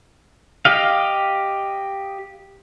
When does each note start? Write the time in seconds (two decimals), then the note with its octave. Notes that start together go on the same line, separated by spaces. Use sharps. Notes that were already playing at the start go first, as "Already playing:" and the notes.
0.65 G4 D#5 F5